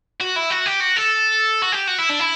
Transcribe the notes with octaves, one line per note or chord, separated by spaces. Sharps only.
F#4
E4
F#4
G4
F#4
A4
F#4
G4
F#4
E4
D4
E4